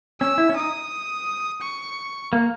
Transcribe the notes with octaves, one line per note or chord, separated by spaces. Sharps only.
C#4 E6
E4
C#4
D#4 D#6
C#6
A#3